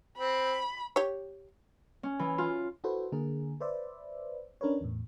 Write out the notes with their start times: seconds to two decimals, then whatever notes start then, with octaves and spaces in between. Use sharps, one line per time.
0.18 C4 B5
0.96 G4 C#5
2.03 C#4
2.19 E3
2.38 F4
2.84 E4 F#4 A4 B4 C5
3.12 D3 A#3 G#4 A#4
3.60 B4 C5 D5 E5
4.61 C#4 D4 A#4 B4 C#5
4.81 E2 A2